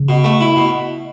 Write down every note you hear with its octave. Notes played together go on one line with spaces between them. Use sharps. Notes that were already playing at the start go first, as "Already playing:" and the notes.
Already playing: C#3
B2
A3
E4
B2